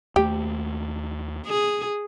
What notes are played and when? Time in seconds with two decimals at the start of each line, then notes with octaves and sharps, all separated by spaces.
0.16 D#2 A3 G4
1.46 G#4